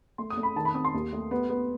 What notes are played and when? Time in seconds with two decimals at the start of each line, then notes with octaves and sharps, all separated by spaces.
0.18 A3 C6
0.30 D#6
0.37 A3
0.43 B5
0.56 D#3 A5
0.65 B5
0.74 C4 D#6
0.85 C6
0.94 D#2
1.12 A3
1.31 B3
1.50 B3